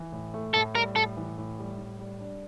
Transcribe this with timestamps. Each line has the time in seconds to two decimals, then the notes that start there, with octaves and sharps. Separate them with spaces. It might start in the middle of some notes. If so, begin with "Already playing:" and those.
Already playing: E3
0.12 A2
0.34 A3
0.54 A2 A4
0.75 G3 A#4
0.96 A2 A4
1.17 E3
1.38 A2
1.59 G3
1.78 A2
1.99 G3
2.20 D4